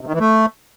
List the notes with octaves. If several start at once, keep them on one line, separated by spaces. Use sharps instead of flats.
C3
D#3
E3
A3